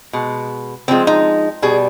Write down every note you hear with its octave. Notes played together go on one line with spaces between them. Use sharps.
B2 G#3
D3 F3 G#3 C4
D#4
B2 G3 G#4